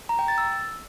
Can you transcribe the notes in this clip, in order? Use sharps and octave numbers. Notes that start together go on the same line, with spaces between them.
A#5
G5
A6
E6